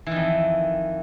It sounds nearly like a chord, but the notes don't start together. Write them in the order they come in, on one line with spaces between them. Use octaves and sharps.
E3 D#3 F2